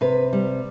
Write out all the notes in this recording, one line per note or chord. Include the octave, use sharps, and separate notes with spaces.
C3 B4
G3